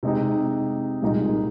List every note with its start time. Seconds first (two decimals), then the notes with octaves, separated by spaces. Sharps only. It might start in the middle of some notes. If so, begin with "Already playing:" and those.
0.03 C3 G#3 D#4
1.02 C2 A#2 G#3 D#4